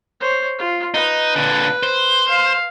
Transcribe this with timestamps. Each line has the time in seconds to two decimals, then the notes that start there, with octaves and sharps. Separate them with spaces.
0.20 C5 C#5
0.58 F4
0.94 D#4 B4
1.36 A#2 D3
1.83 C5
2.28 F5